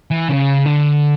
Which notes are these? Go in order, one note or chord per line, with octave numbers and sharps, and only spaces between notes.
E3
C#3
D3